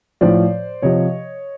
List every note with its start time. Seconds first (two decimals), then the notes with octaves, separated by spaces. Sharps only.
0.21 A2 F3 C5 D5
0.82 C3 F3 C#5 D#5